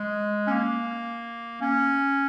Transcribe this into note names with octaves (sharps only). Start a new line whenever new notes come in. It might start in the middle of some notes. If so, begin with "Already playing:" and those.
Already playing: G#3
C#4
A#3
C#4